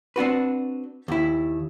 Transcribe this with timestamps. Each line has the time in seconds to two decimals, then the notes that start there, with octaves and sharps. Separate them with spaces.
0.16 C4 D4 F#4 B4
1.08 D#2 E4